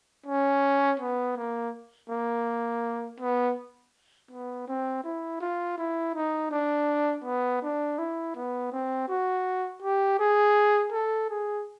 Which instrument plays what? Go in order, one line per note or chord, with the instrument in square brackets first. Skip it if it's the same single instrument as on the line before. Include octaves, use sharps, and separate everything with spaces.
[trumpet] C#4
B3
A#3
A#3
B3
B3
C4
E4
F4
E4
D#4
D4
B3
D4
E4
B3
C4
F#4
G4
G#4
A4
G#4